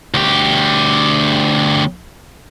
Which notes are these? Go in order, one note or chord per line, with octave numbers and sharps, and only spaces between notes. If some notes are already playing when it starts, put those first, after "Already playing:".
D2 G4